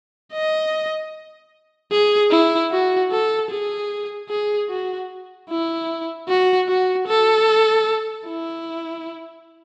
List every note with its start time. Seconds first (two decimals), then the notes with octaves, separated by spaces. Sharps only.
0.33 D#5
1.91 G#4
2.31 E4
2.71 F#4
3.11 A4
3.50 G#4
4.29 G#4
4.69 F#4
5.49 E4
6.28 F#4
6.68 F#4
7.08 A4
8.27 E4